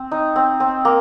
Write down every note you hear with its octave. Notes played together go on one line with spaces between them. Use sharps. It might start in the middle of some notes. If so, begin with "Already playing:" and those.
Already playing: C4
D#4
C4
C4
A#3